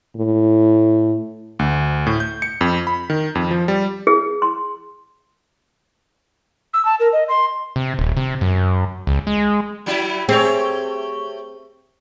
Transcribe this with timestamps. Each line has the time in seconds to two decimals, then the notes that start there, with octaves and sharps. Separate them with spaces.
0.17 A2
1.59 D2
2.07 A2
2.20 G6
2.42 C#7
2.61 F2
2.87 B5
3.10 D#3
3.35 F2
3.51 F3
3.68 G3
4.07 G#4
4.42 C6
6.74 E6
6.85 A5
7.00 A#4
7.13 D#5
7.29 C6
7.76 C3
7.99 D#1
8.17 C3
8.41 F#2
9.07 C#2
9.27 G#3
9.86 F#3 G3 E4
10.29 A3 C4 G4 G#4 C#5